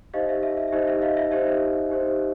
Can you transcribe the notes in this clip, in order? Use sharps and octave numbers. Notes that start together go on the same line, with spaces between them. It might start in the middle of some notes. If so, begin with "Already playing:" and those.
D#4 G4 C5 D#5 F5
E5
E5
E5
E5
D#4 G4 C5 D#5
E5
D#5 F5
E5
D#4 G4 C5 E5
D#4 G4 C5